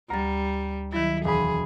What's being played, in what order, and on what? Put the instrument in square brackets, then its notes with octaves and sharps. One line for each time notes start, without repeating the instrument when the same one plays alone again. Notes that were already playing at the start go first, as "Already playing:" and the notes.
[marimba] D2 A6 [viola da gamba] G3 [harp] A#5
[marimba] D#3 F#3 [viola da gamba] E4
[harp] E1 B5 [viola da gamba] G#4